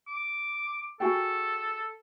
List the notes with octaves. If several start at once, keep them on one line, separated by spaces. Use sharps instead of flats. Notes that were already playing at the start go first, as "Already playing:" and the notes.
D6
F#4 G#4 A4 G5